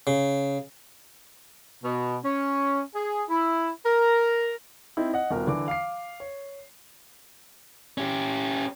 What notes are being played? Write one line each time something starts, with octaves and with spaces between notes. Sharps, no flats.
C#3
B2
C#4
G#4
E4
A#4
C4 D#4 E4
D#5 F#5
D#1 B2 A#4
D3 E3 D6
F5 D6 C7
C#5
C#4 G4